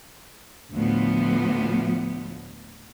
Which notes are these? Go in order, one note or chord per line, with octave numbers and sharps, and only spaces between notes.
D2 A2 F3 B3